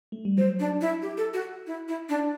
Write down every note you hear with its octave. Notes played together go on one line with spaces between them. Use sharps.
A3
G3
F#3 C5
D4
E4
G4
A4
F#4
E4
E4
D4